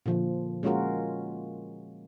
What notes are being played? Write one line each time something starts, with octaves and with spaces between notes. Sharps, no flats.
A#2 D3 F3
G#3 A#3 C#4 F4 F#4 A#4